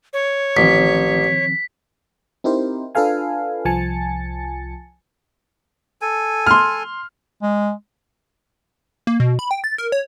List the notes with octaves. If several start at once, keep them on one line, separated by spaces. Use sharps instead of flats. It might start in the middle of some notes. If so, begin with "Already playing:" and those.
C#5
A1 D#3 F3 C4 B6
C4 D#4 E4 G4 A#4 C5
D4 F4 A4 B4 F5 G#5
C2 F3 G#5 A5 A6 C#7
A4 G#5
C6 F6
G#3
A#3
B2
B5
G5
A6
A#4
C#5